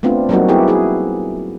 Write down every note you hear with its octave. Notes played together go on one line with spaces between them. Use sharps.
A3 B3 C4 D4 F4
F#3 G3 A#3 C4 D#4 F#4
B3 E4 G4 G#4
E4 G#4 B4